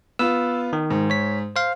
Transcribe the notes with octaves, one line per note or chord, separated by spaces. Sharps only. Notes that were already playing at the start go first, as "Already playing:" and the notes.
B3 F4 E6
D#3
G#2
C#5 B6
C5 F5